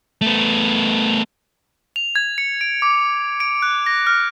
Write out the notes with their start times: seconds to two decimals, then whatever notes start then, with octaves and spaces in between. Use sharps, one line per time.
0.21 A3 B3
1.96 F7
2.16 G#6
2.38 C#7
2.61 D7
2.82 D6
3.40 D7
3.62 F#6
3.86 A#6
4.07 F6